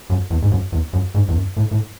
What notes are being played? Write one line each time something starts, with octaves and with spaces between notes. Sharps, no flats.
F#2
E2
G#2
F#2
E2
F#2
G#2
E2
F#2
A2
A2